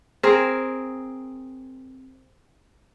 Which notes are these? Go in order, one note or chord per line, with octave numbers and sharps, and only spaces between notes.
C4 G#4 A#4